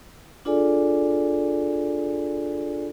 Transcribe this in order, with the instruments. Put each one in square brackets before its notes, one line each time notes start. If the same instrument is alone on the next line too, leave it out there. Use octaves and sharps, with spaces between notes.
[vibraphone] D4 F4 G#4 A4 D5 G#5